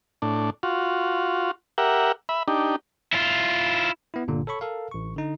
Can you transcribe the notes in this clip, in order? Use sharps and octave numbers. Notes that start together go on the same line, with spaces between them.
A2 D4
F4 F#4
G4 A#4 E5 F#5
E5 B5
D4 D#4 G4
E4 F4
B3 E4
G1 A#2 D3
A4 C#5 B5 C#6
A4 A#4 F5
A1 C#6
D3 D#4